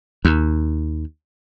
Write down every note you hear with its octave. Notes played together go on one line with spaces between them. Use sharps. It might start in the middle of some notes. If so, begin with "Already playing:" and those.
D#2